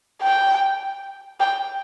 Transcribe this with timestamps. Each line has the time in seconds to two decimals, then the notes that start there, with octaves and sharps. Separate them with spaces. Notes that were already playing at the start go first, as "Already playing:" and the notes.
0.22 G5
1.40 G5